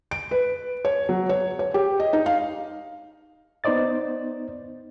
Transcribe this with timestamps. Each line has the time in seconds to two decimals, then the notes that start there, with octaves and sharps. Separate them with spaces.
0.11 D7
0.31 B4
0.85 C#5
1.09 F#3
1.29 C#5
1.59 C#5
1.74 G4
2.00 D#5
2.13 D#4
2.26 F5
3.64 B3 D#4 C5 D5 D#5 A6